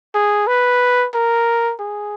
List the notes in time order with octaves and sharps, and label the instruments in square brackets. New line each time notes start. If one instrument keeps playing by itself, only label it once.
[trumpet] G#4
B4
A#4
G#4